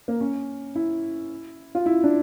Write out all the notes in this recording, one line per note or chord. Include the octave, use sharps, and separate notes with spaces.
A#3
C#4
E4
F4
E4
D4